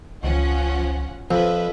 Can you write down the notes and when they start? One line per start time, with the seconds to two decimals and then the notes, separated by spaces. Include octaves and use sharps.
0.23 C#2 F3 C#4 F#5
1.31 F2 F3 B4 E5